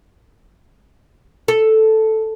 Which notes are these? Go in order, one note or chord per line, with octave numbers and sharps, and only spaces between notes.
A4